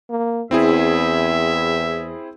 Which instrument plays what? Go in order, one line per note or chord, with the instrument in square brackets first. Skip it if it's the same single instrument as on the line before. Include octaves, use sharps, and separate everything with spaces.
[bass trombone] A#3
[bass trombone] E2 [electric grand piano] C4 E4 G#4 [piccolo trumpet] E5